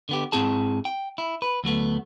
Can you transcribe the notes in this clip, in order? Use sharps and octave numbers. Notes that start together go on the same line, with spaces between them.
D3 B3 G4
G#2 C4 E4 G#4 A5
G5
E4
B4
D2 F#3 A3 B3